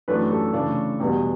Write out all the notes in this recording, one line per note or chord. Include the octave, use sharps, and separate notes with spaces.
F#2 E3 A3 D4 B4
A4
C#3 E3 A3 D4
E2 B2 G3 B3